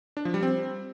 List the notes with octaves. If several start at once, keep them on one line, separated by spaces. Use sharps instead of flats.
D4
F3
G3
C4